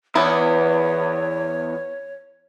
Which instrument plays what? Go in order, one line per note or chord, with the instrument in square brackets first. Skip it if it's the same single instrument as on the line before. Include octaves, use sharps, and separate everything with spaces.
[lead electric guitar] E2 [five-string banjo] B3 E4 B4 [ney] C#5